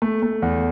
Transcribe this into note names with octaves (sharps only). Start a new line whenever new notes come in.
A3
A3
E2